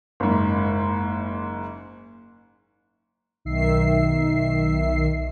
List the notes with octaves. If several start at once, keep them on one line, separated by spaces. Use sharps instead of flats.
F#1 G#2
B1 D#3 E5 C7